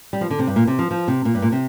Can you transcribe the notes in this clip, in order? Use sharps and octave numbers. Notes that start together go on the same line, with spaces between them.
G3
F3
D3
C3
G2
A#2
C3
F3
F3
C3
A#2
G2
A#2
C3